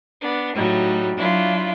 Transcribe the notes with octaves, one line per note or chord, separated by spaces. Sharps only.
B3 D4
A2 F#3 G3 D#4
F#3 D4 E4 F4